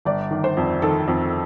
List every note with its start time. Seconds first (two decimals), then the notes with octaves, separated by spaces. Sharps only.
0.05 G1 D5
0.31 D#3
0.44 C5
0.57 F2
0.82 D#3 A4
1.08 F2